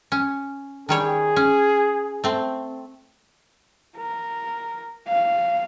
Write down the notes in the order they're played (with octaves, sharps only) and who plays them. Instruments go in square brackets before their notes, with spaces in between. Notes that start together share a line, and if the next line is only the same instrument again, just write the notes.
[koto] C#4
[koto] D#3 G3 C#5 [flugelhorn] G#4
[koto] C#4
A3 C4
[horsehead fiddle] A#4
F5